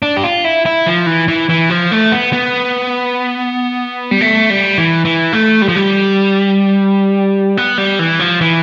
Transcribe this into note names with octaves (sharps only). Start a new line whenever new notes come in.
D4
G4
F4
E4
E4
F3
E3
E3
E3
F3
A3
B3
B3
G3
A3
G3
E3
E3
A3
G3
F3
G3
B3
G3
E3
F3
E3